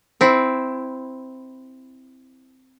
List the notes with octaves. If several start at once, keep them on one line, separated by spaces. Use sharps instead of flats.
C4 E4